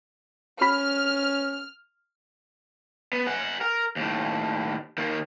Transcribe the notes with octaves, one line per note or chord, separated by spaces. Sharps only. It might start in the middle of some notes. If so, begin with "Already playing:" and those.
C#4 F#4 B5 F6 B6
B3
G#4 F#5
A#4
D#2 A2
D#3 A#3